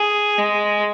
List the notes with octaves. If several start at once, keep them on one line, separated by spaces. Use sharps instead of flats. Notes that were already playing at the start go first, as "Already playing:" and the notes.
Already playing: G#4
G#3